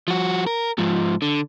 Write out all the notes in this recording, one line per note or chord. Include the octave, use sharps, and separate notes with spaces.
F3 F#4
A#4
G#2 F3
D3